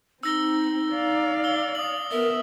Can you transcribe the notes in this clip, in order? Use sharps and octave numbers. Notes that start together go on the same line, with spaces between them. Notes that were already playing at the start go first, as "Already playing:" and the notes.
C4 D#4 E6 A#6 G7
D5 F5
E6 G7
D#6 F#7
B3 A#4 E5